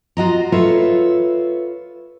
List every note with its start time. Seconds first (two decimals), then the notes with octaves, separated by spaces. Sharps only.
0.17 F4 F#4 D#5 A#5
0.52 F4 A4 B4 C#5 E5